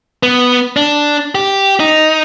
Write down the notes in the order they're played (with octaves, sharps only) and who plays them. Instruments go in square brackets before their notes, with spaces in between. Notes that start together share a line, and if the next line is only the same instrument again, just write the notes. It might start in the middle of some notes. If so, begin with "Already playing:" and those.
[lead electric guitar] B3
D4
G4
D#4